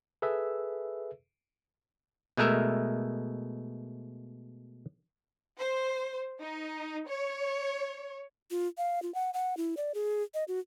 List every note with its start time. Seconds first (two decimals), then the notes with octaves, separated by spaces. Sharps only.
0.22 G#4 A4 B4 E5 E6
2.37 B2 G#3 A3 A#4 E5
5.59 C5
6.40 D#4
7.09 C#5
8.51 F4
8.78 F5
9.02 F4
9.15 F#5
9.34 F#5
9.57 E4
9.77 D5
9.94 G#4
10.34 D#5
10.48 F#4